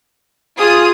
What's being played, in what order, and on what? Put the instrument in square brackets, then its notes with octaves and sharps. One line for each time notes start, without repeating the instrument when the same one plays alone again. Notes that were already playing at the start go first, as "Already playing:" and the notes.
[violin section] F4 D#6 [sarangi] G#4